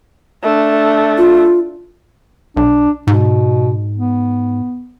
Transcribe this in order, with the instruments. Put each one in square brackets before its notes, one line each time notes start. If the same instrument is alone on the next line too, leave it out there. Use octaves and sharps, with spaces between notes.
[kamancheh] A3 D4
[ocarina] F4
[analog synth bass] B1 [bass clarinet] D4
[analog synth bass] G#2 [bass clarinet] B2
[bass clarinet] B3